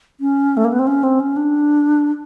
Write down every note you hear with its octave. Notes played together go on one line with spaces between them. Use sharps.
C#4
A3
A#3
B3
C4
C#4
C4
C#4
D4